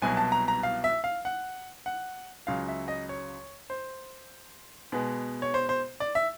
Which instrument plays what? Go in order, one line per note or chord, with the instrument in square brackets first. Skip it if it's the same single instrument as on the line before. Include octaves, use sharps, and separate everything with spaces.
[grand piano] C2 B2 F#3 G#5
A5
A#5
A#5
F5
E5
F5
F#5
F#5
C#2 C#3 F#3 F5
E5
D#5
C#5
C5
B2 G#3 B3
C#5
C5
C5
D5
E5